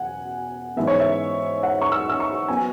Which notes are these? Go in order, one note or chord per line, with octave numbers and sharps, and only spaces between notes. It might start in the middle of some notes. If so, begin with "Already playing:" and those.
Already playing: E2 B2 F#3 F#5 G#5
G#2 E3 G#3 B3 E5
C#5
E5
F#5
C#6
E6
E6
C#6
F#3 B3 G#5